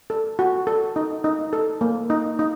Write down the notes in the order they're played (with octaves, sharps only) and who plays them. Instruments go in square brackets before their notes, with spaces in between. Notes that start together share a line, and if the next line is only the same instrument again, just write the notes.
[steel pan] A4
F#4
A4
D#4
D#4
A4
A#3
D#4
D#4